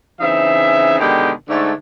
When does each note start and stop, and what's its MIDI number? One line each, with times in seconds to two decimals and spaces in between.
0.20 0.98 49
0.20 0.98 52
0.20 0.98 60
0.20 0.98 63
0.20 0.98 76
1.00 1.30 47
1.00 1.30 50
1.00 1.30 51
1.00 1.30 56
1.00 1.30 67
1.49 1.73 44
1.49 1.73 50
1.49 1.73 57